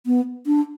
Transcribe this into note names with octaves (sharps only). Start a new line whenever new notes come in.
B3
D4